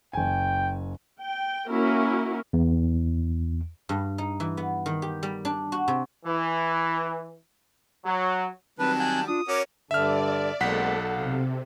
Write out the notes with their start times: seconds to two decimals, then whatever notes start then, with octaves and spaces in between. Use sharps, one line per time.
0.13 F#1 G5 G#5
1.20 G5
1.69 A#3 C#4 E4 F#4 A#4
2.53 E2
3.89 G2
4.18 D#4
4.40 E3
4.57 B3
4.86 D#3
5.02 G4
5.23 G3
5.45 D4
5.72 F#4
5.88 C3
6.26 E3
8.05 F#3
8.79 D#3 F#3 G3 C4 B4 A5
9.00 F#5 G#5 G6
9.27 D4 F4 D#6
9.48 C#4 F#4 A#4 C#5 D6
9.91 G2 D3 D4 D5 E5 F6
10.60 B1 G#3 A#3 C4 A4 F#5 B6
11.15 C3 F5